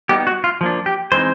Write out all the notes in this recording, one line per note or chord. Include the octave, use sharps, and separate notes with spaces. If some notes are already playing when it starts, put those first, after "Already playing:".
G3 B3 D#4 G4
F#4
F4
F3 A#3 D4
G4
E3 G#3 C4 D#4 C5